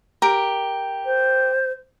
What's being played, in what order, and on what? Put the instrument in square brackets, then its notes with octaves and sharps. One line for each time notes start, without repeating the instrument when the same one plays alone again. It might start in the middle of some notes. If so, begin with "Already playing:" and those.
[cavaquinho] G4 A#4
[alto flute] C5